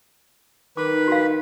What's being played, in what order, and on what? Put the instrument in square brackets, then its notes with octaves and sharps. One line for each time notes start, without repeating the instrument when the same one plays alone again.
[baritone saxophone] D#3 [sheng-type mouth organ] B4 [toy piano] D6
[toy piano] F#4 F5